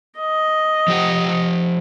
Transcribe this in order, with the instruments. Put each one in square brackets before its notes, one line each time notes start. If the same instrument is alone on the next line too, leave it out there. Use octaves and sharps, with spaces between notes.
[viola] D#5
[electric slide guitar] F3 G4 F#5